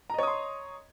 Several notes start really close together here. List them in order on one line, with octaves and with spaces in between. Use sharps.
A#5 D#5 C#5 D#6 C6